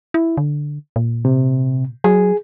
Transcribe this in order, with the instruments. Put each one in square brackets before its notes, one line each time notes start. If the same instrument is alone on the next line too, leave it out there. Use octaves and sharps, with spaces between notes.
[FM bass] E4
D3
A#2
[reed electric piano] C3
[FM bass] F#3 [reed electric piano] G#4